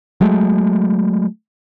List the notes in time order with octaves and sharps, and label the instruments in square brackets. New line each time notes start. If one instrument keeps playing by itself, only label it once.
[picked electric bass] F#3 G#3 A3